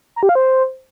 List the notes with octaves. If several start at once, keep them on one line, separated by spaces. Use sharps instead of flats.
A#5
G4
F5
C5